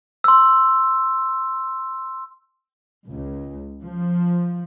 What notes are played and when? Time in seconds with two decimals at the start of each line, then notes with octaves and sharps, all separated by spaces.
0.24 C6 E6
3.07 C#2
3.84 F3